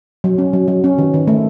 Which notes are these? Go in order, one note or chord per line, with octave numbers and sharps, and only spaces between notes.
F#3
C#4
F#3
F#3
C#4
D#3
D#3
A3